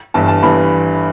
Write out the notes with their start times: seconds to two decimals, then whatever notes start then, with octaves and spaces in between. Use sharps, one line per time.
0.14 G1 G2 E3 A5
0.28 A5
0.42 G1 G2 E3 B5